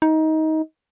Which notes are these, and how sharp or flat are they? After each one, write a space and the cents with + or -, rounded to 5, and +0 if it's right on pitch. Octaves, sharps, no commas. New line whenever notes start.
D#4 +20